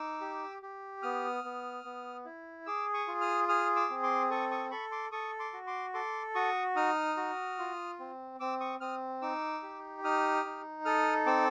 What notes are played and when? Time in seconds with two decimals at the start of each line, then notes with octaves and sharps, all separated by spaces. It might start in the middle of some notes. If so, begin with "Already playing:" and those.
Already playing: D#4 D6 E6
0.21 G4
0.63 G4
1.02 B3 D#6 F6
1.44 B3
1.84 B3
2.25 E4
2.66 G#4 D6 E6
2.94 C#6 D#6
3.08 F4
3.21 D#6 F6
3.48 G#4 D#6 F6
3.76 D6 E6
3.90 C4
4.03 C6 D6
4.31 A4 C#6 D#6
4.51 C#6 D#6
4.71 A4 B5 C#6
4.91 C6 D6
5.12 A4 C#6 D#6
5.39 C6 D6
5.53 F#4
5.67 C6 D6
5.94 A4 C6 D6
6.35 F#4 C#6 D#6
6.76 D#4 D#6 F6
7.17 F#4
7.59 F4
8.00 C4
8.40 C4 D6 E6
8.60 C#6 D#6
8.80 C4 D#6 F6
9.21 D#4 D6 E6
9.62 G4
10.04 D#4 D#6 F6
10.45 D#4
10.85 A4 D#6 F6
11.26 C4 D6 E6